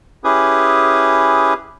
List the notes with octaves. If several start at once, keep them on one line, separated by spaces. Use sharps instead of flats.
C#4 E4 G4 G#4 B4 D#6